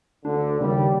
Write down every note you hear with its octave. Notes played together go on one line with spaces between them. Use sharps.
D2 D3 D4
D#2 C#3 G3